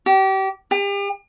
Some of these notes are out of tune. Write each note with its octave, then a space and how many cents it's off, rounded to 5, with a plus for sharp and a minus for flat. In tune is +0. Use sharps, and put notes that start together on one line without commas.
G4 -30
G4 +40